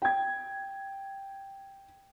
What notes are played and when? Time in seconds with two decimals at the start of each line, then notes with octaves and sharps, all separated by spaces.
0.02 G5 G#6